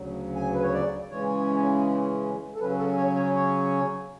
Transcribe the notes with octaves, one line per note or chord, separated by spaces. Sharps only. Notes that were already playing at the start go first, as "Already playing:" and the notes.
Already playing: D2 C#3 F#3
G#5
B4
C#5
D5
C#3 E3 G#3 C#4 C#5
A4
C#3 F#3 C#4 B4
A4
C#5
C#5
C#5